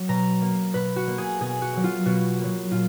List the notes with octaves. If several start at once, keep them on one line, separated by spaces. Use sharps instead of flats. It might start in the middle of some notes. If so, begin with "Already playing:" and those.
Already playing: F#3
B2 A#5
A#3
B2 B4
F#4
A#3
G#4
B2 G#4
F#4
F#3 A#3
F4
B2 F#4
F#3 A#3
A#2 F4